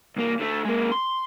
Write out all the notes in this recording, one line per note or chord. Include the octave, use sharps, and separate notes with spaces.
C2 A#3
D3 A3
G#3 A#3
C6